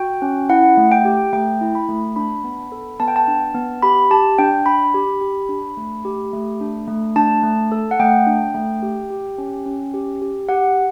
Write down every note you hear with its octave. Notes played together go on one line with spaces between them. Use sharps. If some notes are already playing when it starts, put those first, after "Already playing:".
Already playing: F#4 G5
C#4
E4 F#5
A3
G5
G4
A3 G5
E4
B5
A3
D4 B5
B3
A4
B3 A5
G5
A5
D4
B3
G4 B5
G4 A5
D4 G5
D4 B5
G4
G4
D4
A3
G4
A3
D4
A3
D4 A5
A3
A4
F#5
A3 G5
D4
A3
G4
G4
C#4
C#4
G4
G4
G4 F#5